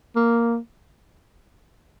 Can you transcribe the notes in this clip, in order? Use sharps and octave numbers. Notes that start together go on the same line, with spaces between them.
A#3